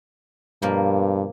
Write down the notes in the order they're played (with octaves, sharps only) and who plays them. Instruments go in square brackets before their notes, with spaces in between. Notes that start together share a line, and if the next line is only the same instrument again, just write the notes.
[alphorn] G2 [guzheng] B2 F3 A#3